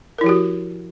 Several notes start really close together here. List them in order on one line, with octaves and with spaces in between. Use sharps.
A#4 E4 F3 G4 F#4